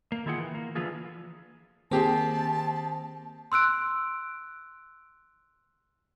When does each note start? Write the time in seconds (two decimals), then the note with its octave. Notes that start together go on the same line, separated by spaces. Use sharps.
0.12 A#3
0.26 D#3 E4 F4 G#4 F#5 G5
0.38 E3
0.55 A#3
0.75 D3 E3 F3 E4 F4 G#4
1.91 D#3 A#3 C4 G4 G#4 C5 A5
3.52 C6 E6 F#6 D7